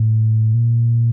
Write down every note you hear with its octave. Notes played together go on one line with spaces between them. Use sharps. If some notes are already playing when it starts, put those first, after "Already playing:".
Already playing: A2
A#2